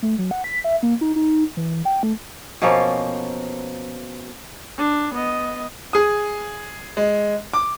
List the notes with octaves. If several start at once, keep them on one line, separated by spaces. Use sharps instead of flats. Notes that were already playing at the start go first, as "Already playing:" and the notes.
A3
F#3
F#5
B6
E5
A#3
D#4
D#4
E3
G5
A3
B2 F3 A#3 C#4
D4
B3 D#5
G#4 D#6
G#3
D6